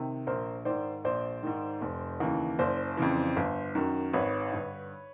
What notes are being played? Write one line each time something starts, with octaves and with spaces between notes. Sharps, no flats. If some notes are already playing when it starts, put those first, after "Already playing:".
Already playing: C3 D#3
A#1 A#4 C5
G#2 D#3 C5 D5
A#1 C5 D5
G#2 D#3
F1
D#2 C#3 E3
F#1 C5 D5
F2 C#3 E3
G1
F#2 D#3
G#1 B4 C#5
G2 D3